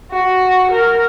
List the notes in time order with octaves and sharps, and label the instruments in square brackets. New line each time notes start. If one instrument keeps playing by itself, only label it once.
[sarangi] F#4
A#4